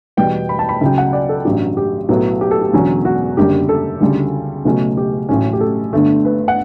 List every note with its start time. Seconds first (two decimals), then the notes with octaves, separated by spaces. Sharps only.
0.17 E2 B2 G3 B3 G5
0.49 B5
0.59 A5
0.69 B5
0.81 C#2 C#3 F#3 G5
0.98 F#5
1.13 D5
1.29 A4
1.45 A1 G2 F#3 G4
1.77 G4
2.09 B1 A2 F#3 B3
2.41 G4
2.51 A4
2.61 G4
2.73 E1 E2 D3 F#3 C#4
3.05 F#4
3.37 F#1 F#2 D3 G3 G4
3.69 A4
4.01 D2 C#3 G3
4.65 C#2 B2 F#3 A3 C#4
4.97 G4
5.29 A1 A2 F#3 A3 C#4
5.53 G4
5.60 A4
5.93 G1 G2 D3 A3
6.25 B4
6.48 F#5